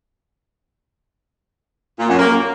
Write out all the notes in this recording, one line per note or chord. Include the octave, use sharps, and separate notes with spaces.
A#2
F#2
A#3